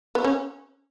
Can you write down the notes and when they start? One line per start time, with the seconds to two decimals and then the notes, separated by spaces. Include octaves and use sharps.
0.15 B3
0.24 C#4